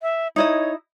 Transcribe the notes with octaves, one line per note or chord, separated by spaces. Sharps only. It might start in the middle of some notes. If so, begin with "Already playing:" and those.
E5
D#4 E4 C#5 D#5